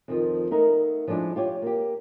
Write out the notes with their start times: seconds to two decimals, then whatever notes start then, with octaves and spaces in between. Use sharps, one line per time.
0.08 F2 D#3 F3
0.51 A3 B3 D#4 A#4
1.07 F3 G#3 A3 D4 E4
1.36 F4 G4 C#5
1.62 A#3 G4